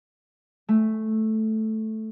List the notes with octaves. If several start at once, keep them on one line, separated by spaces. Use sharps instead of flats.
A3